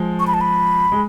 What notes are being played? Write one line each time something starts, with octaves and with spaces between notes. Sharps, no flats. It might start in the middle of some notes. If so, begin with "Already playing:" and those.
Already playing: F3 G#3
C#6
B5
A5
B5
G#3